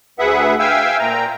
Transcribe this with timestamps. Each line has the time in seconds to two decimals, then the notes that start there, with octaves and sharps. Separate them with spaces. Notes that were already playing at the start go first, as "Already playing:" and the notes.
0.19 D2 G#4 B4 E5 F#5
0.59 E5 F5 G5 G#5 E6
0.99 A#2 G5 A#5